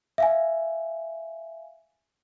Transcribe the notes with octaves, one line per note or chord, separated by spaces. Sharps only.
E5 F5 G#5